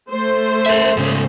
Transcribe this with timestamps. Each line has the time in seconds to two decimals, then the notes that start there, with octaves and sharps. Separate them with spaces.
0.10 A3 C5
0.66 A#4 E5
0.97 G#2 C#3